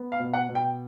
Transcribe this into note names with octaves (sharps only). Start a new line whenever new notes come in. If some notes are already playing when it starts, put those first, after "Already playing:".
Already playing: B3
F5
B2
F#5
B2
G5